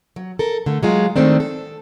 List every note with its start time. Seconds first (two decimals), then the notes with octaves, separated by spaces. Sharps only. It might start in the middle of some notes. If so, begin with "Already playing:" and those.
0.16 F#3
0.39 A4 A#4
0.66 D3 A3
0.83 F#3 G#3 F4
1.16 D#3 G#3 A3 C4 D4
1.40 A4